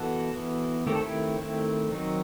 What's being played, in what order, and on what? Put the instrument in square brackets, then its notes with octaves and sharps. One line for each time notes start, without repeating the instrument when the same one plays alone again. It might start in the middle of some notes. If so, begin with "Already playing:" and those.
Already playing: [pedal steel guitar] E3 B3 F#4 A4
E3 B3
D#3 A3 C4 G4
A4
E4 G4
D#3 A3 C4
D#3 F#3 C4 D#4